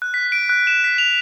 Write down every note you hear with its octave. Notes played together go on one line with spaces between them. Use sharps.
F#6
B6
D7
F#6
E7
B6
F7